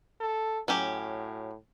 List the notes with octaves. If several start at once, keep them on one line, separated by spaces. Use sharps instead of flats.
A4
A2 F#3 C#4 G4